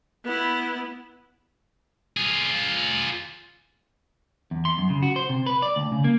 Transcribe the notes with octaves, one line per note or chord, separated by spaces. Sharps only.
B3 E4
F4 G#4
E2
C6
F#2
C#3
F#4
C5
C3
B4
D5
D2
C#3
A#3